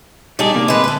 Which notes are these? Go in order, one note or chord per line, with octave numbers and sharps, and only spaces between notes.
G3 D4 D#4 G#4 D5
C3 D#3 A#3
D2 G#3 B4
A4 B4